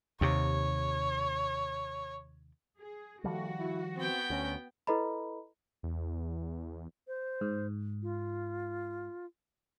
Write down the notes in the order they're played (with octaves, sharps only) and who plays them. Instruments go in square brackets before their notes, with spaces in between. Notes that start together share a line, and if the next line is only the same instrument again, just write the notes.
[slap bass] D#2 C3 [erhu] C#5
[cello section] G#4
[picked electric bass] D#3 F3 G3 [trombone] A3 [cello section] F#4
[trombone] E4
[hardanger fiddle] B3 G5 [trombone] C4
[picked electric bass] D2 [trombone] C#4
[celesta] E4 A4 B4 D#5 A#5 B5
[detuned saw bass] E2
[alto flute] C5
[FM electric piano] G#2
[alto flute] F4